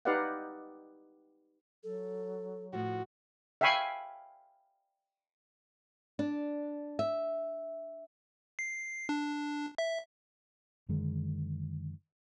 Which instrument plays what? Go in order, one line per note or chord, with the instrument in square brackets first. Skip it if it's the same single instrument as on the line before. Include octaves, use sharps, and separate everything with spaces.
[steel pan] D#4 G4 B4 D5 F5 F#5
[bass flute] F#3 [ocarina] A4
[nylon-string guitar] A2 F3 [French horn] F#4
[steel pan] E5 F5 G5 G#5 B5 C#6
[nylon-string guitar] D4
E5
[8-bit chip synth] C7
D4
E5
[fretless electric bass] F#2 D3 D#3 G#3